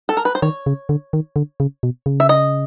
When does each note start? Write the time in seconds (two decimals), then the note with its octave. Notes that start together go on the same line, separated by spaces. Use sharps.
0.09 A4
0.17 A#4
0.25 B4
0.35 C5
0.42 D#3 C#5
0.66 C#3
0.89 D3
1.13 D#3
1.36 D3
1.60 C#3
1.83 B2
2.06 C#3
2.20 E5
2.29 D#5